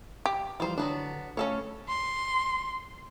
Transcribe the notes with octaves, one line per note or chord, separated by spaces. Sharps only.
G4
E3 F3 G3 F4 C5
D3 F#3 B3 D4
A3 C#4 A4 C#5 F5
C6